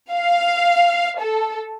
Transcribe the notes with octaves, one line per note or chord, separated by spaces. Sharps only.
F5
A4